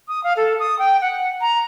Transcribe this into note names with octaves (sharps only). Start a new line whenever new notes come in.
D#6
F5
A4
D#6
G5
F#5
A#5